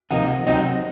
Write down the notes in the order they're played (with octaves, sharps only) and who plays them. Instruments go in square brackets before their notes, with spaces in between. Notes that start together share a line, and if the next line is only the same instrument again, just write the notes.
[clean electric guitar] C3 F3 A#3 D#4 [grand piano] D#5 F#5
[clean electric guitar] C3 F#3 C4 D#4 [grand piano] D#5 F#5